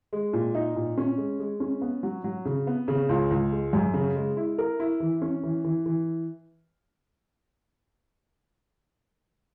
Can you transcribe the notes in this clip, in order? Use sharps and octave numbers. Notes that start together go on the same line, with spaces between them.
G#3
A#2
D#4
A#2
C#4
G#3
G#3
C#4
B3
F#3
F#3
C#3
B3
C#3
C#2
C#2
G#3
F#2
C#3
G#3
E4
A#4
E4
E3
C#4
E3
E3
E3